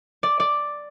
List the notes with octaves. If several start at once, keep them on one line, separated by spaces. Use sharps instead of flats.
D5
D5